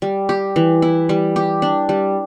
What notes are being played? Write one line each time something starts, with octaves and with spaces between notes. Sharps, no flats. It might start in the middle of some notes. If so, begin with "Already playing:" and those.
G3
G4
E3
E4
G3
G4
D4
G3